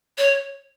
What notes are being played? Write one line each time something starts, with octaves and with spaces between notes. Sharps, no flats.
C#5